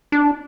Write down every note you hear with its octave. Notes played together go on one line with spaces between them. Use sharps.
D4